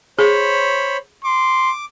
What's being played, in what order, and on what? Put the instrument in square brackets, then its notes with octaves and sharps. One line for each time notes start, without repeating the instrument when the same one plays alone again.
[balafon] G#4 [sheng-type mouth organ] C5 C#5 B5
[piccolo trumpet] C6 [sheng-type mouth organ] D6